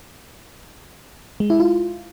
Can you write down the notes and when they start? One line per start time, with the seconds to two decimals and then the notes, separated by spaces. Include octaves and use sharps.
1.40 G#3
1.50 E4
1.60 F4